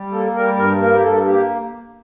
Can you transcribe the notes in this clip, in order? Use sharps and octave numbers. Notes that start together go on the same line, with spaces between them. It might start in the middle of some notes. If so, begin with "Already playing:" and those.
Already playing: G3
A#3 A4
G3 A#4
G2 A#4
A#3 A#4
G4
G2 A4
A#3 G4